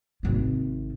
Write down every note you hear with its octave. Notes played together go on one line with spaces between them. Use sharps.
G#1 C3